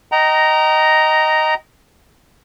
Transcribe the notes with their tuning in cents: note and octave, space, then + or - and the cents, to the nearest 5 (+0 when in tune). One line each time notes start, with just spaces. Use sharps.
D#5 +0 G5 -35 A#5 +0